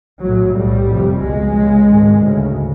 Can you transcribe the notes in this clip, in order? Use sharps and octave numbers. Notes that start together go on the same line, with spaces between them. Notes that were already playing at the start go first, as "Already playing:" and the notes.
B1 A2 F#3
B1 A2 G3
F1 F2 C3
C#2 B2 G#3
C#2 C#3
G#1 G#2
D2 C#3